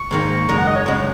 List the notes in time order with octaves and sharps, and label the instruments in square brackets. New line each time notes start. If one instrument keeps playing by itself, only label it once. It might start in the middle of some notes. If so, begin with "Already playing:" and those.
Already playing: [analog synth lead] C#6
[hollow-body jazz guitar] G#2 D#3 A#3
[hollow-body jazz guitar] F#2 C#3 G#3 [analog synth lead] A#5
[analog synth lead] F#5
D#5
C#5
[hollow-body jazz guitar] F#2 C#3 G#3